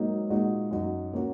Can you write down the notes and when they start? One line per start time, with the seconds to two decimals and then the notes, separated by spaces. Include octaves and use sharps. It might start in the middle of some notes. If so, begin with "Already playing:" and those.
Already playing: G#2 F#3 A#3 D#4
0.30 A#2 G#3 D#4 F#4
0.71 F#2 F#3 D#4 F#4
1.12 A#2 A#3 C#4 F#4